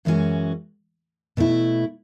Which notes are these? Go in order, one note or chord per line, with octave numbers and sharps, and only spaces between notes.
F#2 E3 G#3 C#4 F#4
B2 A3 E4